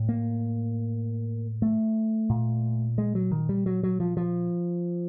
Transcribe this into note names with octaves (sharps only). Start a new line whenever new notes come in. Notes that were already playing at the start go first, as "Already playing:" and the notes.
Already playing: A2
A#3
A3
A#2
G#3
F#3
D#3
G3
F#3
F#3
F3
F3